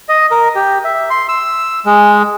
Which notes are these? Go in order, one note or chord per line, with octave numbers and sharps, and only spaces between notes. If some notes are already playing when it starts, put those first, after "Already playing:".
D#5
A#4
G4
E5
C6
E6
G#3